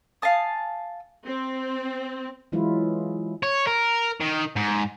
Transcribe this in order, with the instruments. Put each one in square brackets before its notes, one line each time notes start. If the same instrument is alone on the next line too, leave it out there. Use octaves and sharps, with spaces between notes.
[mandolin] F5 G#5 A5 D#6
[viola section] C4
[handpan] E3 F#3 G#3 E4 F4
[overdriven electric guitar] C#5
A#4
D#3
G#2